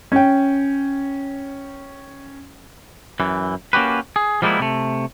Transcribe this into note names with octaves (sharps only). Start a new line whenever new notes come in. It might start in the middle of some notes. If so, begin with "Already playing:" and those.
C#4 G5
F#2 E3
A#3 C#4 F#4 G4 B4
G#4
F3 G3 G#3 A#3 B3 E4
C3 A3